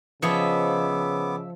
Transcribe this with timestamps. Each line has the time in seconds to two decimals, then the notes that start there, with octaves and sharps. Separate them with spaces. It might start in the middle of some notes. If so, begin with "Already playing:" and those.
0.22 C#3 F3 B3 C#5 D#5 E5 D6